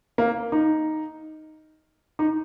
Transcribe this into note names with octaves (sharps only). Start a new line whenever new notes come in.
A#3
D#4
D#4